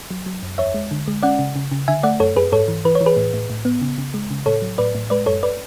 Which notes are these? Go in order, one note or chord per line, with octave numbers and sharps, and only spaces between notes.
F#3
F#3
F#2
E2 C#5 E5
G#3
D3
G#3
C#4 D5 F#5
C#3
C#3
C#3
D3 E5 G#5
A3 D5 F#5
F#2 A4 C#5
F#2 G#4 B4
G#2 A4 C#5
E3
E3 B4
C#5
E3
G#4 B4
A2
A2
A2
B3
C#3
C#3
G#3
C#3
A2 A4 C#5
F#3
A2 B4 D5
A2
G#3 B4 D5
F#2 A4 C#5
B4 D5